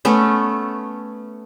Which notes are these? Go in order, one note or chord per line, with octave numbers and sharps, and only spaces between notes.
A3 B3 C#4